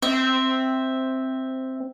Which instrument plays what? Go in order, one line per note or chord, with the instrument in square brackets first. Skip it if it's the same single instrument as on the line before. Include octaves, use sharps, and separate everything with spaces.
[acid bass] C4 [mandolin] E5